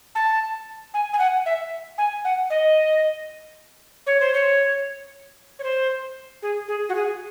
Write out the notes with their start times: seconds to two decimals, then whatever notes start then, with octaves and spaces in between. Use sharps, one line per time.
0.15 A5
0.94 G#5
1.13 G#5
1.19 F#5
1.46 E5
1.98 G#5
2.24 F#5
2.50 D#5
4.06 C#5
4.20 C5
4.34 C#5
5.59 C#5
5.63 C5
6.42 G#4
6.68 G#4
6.89 F#4
6.95 G#4